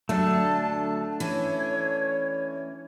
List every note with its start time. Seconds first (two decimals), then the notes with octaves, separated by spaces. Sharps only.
0.09 D2 F#3 A3 D4 A4 A5
1.20 E3 C#4 C#5